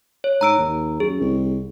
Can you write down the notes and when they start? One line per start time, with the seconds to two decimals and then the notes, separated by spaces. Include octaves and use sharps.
0.24 C#5
0.41 G#2 A#5 E6 D7
0.58 D#2
1.00 F#2 G#4
1.21 C2